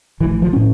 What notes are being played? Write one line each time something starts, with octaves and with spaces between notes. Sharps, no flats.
A1 A2 E3
E3
F3
A2 C#4